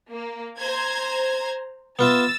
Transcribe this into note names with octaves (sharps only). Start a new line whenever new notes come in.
A#3
C5 A#5 G#6
B3 F4 E5 E6 A6